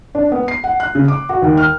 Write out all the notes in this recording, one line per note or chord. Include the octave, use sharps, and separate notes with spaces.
D4
B3
C7
F#5
F#6
C#3
D6
F#4
D#2
F6